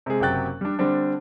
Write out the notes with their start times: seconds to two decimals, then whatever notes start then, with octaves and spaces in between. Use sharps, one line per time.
0.06 C3 G#3 G#4
0.20 F#1 C3 F#3 G5 F#6 A6
0.61 G3 D4
0.79 D3 G3 C4 D4